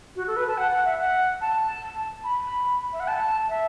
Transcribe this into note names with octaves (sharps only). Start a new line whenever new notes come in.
F#4
A4
B4
A5
F#5
F#5
E5
F#5
A5
B5
E5
F#5
A5
E5